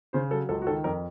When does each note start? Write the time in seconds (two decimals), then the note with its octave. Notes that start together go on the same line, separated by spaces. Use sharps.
0.13 C#3 C5
0.31 F#3 A4
0.49 C#2 A4
0.62 F#4
0.67 D#3 A4
0.84 F2 A#4